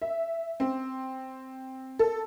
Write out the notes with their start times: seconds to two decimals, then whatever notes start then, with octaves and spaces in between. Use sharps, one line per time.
0.02 E5
0.60 C4
1.99 A4